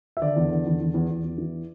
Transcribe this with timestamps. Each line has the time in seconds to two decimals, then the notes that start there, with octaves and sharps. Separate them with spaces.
0.17 E5
0.22 D3 D5
0.36 E2
0.52 D3
0.66 E2
0.81 E2
0.94 E2
1.09 E2
1.24 E2
1.38 E3